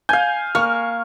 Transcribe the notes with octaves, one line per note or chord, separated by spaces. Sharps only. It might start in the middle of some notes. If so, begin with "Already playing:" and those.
F5 G#5 G6
A#3 C#6 F6